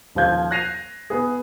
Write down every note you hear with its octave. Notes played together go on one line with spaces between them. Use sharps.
D#1 F3 F4 G6 G#6
F#6 G#6 A#6 C7 D#7 F7
B3 G#4